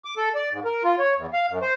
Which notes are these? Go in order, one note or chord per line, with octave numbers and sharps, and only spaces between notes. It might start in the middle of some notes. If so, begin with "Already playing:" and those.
D6
A4
D5
G#2
A#4
F4
C#5
E2
F5
F#2
C5